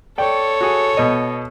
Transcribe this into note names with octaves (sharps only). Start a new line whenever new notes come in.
A4 C#5 D5 G5
F#4 G#4
B2 D#5